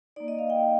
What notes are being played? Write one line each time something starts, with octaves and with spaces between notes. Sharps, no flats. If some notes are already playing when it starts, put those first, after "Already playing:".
A#3 D#4 D5
D#5
F5
G5